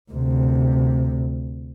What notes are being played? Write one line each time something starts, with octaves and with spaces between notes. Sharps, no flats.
D2 C3